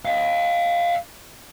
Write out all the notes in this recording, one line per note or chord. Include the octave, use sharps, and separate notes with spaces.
D#5 F5